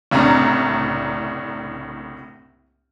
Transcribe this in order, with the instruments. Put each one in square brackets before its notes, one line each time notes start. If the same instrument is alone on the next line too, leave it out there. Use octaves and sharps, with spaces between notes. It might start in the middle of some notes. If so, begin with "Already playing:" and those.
[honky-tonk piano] F#1 C2 A2 D4 A#5